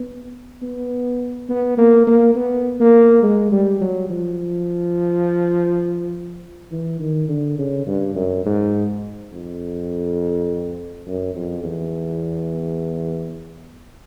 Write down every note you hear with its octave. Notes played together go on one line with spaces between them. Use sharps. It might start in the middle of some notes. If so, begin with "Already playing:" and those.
Already playing: B3
B3
B3
A#3
A#3
B3
A#3
G#3
G3
F#3
F3
E3
D#3
D3
C#3
G2
F#2
G#2
F2
F#2
F2
E2